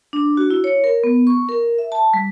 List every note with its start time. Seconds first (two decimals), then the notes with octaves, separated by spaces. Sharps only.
0.13 D4
0.37 F#4
0.50 E4
0.64 C#5
0.84 A#4
1.04 B3
1.27 C#6
1.49 A#4
1.78 E5
1.92 A5
2.14 G3